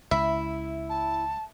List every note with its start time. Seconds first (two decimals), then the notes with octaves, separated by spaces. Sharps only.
0.11 C#2 E4 E5
0.89 A5